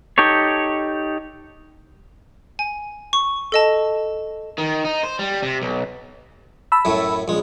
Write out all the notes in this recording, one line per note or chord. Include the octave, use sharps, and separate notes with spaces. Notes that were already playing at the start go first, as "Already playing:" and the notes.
D#4 G4 A4 C#5
G#5
C#6
A4 D#5 A5
D#3
D#4
C5
G3
C3
B1
A5 B5 E6
F#2 A2 F#3
A#1 G#3